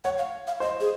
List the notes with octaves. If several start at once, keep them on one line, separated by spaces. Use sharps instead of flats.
C#5 F#5
F5
F5
C5 D#5
G#4